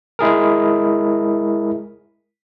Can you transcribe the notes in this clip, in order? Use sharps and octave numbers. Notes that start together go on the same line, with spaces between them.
G#3 E4 G#4 A#4